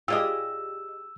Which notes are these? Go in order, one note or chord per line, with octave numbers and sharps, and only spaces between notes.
F4 G4 G#4 D5 D#5 E6